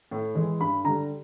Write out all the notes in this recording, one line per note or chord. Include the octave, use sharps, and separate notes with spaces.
A2
E3 G#3
G2 B5
D3 G3 A#5